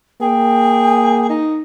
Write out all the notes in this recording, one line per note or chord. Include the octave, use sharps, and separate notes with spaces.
A#3 G#4 G5
D#4